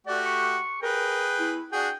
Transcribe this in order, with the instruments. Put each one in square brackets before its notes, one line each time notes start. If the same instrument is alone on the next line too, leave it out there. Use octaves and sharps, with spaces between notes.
[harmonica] A3 F#4 G4 [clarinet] D5
[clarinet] C#6
[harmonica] G#4 B4 G5 [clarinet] A#4
[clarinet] E4
[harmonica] D4 F#4 G#4 [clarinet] G5